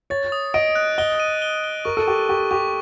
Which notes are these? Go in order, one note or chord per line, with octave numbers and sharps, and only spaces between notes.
C#5 A6
D#6
D#5 D7
F#6
D#5 G7
D#7
G7
G7
A#4 C#6
A4
G4 C#6
G4 C#6
G4 C#6